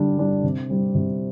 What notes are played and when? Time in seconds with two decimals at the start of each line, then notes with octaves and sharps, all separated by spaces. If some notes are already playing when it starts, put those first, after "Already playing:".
Already playing: D3 G3 D4
0.18 G3 D4
0.44 C3
0.70 G3 C4
0.95 C3